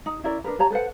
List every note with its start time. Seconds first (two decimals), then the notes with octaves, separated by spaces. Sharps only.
0.06 D#4
0.23 C#4 E4 A#4 D5
0.44 D4 A#4 B4
0.59 G4 C#5 A5 A#5
0.70 A4 B4 C5 F#5